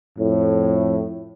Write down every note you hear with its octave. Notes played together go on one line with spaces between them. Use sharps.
F2 A2